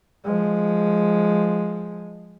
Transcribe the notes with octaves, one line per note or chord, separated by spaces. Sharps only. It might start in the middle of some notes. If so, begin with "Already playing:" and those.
F3 G#3